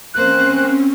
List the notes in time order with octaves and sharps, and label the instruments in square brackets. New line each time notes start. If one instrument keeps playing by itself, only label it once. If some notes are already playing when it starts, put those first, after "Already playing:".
[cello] A#3 C5 [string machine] C4 C#4 [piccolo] F#6